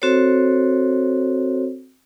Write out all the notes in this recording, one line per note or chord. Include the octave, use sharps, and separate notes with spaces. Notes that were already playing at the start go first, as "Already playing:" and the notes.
C4 F#4 A4 C5 C#5